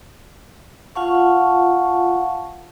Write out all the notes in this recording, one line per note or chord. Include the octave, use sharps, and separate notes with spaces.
F4 F5 F#5 A5 C#6